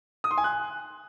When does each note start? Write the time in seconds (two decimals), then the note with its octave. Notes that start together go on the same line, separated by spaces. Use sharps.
0.24 D#6
0.31 C6
0.38 G#5
0.44 F#6